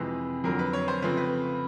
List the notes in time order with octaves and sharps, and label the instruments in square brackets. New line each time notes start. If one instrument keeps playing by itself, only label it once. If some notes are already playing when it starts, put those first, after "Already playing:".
Already playing: [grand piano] F2 C3 E3 G#3 C4 B4
F2 D3 F#3 A#4
B4
C#5
C5
C#3 F3 A3 C4 B4
B4